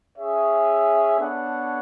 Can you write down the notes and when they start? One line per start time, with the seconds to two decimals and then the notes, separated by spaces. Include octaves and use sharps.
0.18 C#4 G#4 C#5 E5
1.20 B3 D4 A4 C#5 F#5